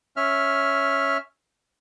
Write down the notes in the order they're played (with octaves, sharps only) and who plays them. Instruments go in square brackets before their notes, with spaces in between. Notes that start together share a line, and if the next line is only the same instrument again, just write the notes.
[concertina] C#4 E5 F6